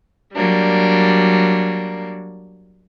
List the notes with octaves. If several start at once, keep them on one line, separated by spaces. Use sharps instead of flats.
F#3 G3 A#3 D4